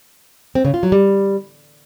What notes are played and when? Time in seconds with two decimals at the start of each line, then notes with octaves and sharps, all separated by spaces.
0.55 C4
0.65 C#3
0.74 F4
0.83 F#3
0.92 G3